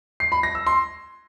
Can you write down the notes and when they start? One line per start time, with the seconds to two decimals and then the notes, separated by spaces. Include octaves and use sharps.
0.20 C7
0.32 B5
0.43 A#6
0.55 E6
0.67 C6